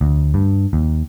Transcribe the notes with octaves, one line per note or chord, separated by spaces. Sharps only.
D2
G2
D#2